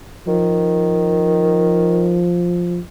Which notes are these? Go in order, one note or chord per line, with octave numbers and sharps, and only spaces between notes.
D#3 F3